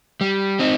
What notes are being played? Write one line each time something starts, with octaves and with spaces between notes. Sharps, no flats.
G3
C4 D#4